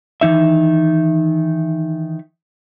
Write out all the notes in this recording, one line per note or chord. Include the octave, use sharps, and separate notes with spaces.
D#3 E3 D#4 E5